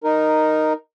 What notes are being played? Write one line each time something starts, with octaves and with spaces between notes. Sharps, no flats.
D#4 A#4